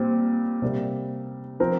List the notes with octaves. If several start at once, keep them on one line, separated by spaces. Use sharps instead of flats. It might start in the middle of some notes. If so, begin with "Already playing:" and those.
Already playing: A#2 G3 C4
C3 G3 A#3
F3 C4 A#4